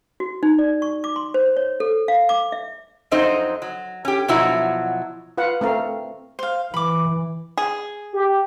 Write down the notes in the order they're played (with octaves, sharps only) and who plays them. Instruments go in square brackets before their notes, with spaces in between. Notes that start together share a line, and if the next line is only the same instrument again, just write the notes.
[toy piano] F#4
D#4
D5
C#6
D6
C6
C5
C#5
A4
F5
D6
E5
[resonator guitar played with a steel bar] F2 F#3 C4 D#4 C5 D#5
F#3
C#4 G4
B2 F3 F#3 E4 F#4 A#5
[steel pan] F4 B4 F5 F#5
A3 C4 A#4 F5
[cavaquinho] C5 F5
[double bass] E3 [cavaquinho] B5 D6
[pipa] G#4
[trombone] G4